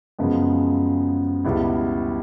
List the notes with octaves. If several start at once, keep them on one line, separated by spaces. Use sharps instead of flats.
F#2 C#3 F3 G#3 B3
C#2 B2 G3 B3 E4